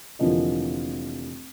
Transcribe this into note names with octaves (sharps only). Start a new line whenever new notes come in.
F1 D3 E3 F3 A#3 D#5